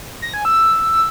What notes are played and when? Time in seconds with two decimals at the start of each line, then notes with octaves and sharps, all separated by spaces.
0.22 A#6
0.34 G#5
0.45 E6